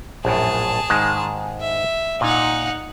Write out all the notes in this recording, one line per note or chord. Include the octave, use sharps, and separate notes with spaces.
A#1 F#2 A2 G#4 A5
G#2 D#3 G#3
E5
A#2 D#4 F#5